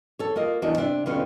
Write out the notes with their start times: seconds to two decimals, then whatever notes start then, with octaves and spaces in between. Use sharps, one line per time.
0.19 A4 C#5
0.36 A#3 F4 D#5
0.62 E2 D4 F#4 D#5
0.77 C3 D4 E5
1.06 D#2 B2 D3 C#4 D#4 F4